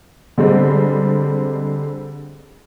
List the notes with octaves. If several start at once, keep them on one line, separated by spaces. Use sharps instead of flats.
D3 G3 G#3 C4